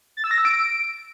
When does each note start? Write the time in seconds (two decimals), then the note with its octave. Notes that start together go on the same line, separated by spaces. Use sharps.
0.17 A6
0.24 E6
0.31 A#6
0.38 E6
0.45 D7